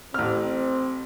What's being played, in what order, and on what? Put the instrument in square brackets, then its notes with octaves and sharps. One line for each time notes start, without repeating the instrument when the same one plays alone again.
[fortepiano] A1 F6 [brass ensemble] C4